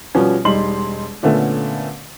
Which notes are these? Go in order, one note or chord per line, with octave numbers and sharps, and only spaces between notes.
B2 F3 G3 B3 C#4
E1 G3 D#4 C6 F#7
A#2 D3 A3 B3 C#4